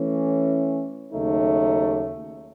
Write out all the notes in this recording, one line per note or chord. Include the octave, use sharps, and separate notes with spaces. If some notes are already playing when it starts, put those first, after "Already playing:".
Already playing: E3 A3 C#4
D#2 C#3 F#3 A3 D#4